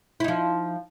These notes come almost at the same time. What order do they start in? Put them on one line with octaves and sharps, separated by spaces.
E4 D#4 F3